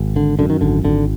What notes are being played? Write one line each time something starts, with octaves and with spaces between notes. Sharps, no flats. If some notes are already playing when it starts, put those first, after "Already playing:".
Already playing: G#1
D3
F#2 D3
D#3
G#1 D3
G#1 D3